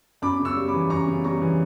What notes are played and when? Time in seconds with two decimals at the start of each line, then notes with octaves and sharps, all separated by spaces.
0.22 F#2 B5 D6
0.39 C#3
0.45 C#6 E6
0.56 G3
0.68 B5 D6
0.74 E3
0.90 F#2 A#5 C#6
1.07 C#3
1.24 G3 A#5 C#6
1.42 E3